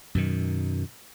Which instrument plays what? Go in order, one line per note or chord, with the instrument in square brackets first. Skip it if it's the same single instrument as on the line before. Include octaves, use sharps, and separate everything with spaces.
[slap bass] F#2 B2 D#3